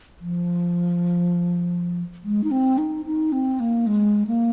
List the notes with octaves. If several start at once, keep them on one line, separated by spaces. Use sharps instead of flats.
F3
G#3
D#4
C4
D#4
D#4
C4
A#3
G#3
A#3